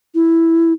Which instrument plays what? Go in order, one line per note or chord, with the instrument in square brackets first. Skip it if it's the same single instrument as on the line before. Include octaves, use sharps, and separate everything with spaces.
[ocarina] E4